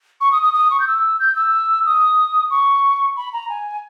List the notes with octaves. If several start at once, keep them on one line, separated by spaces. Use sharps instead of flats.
C#6
D#6
D#6
D#6
C#6
G6
E6
G6
E6
D#6
C#6
B5
A#5
G#5